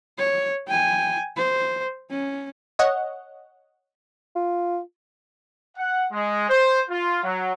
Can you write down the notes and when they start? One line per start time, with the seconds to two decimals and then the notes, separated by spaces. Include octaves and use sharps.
0.19 C#5
0.67 G5 G#5
1.37 C5
2.10 C#4
2.79 C#5 D#5 F#5
4.36 F4
5.77 F#5
6.12 G#3
6.49 C5
6.90 F4
7.23 F#3